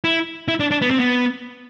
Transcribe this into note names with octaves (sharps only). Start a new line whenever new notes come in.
E4
E4
D4
D4
B3
C4
B3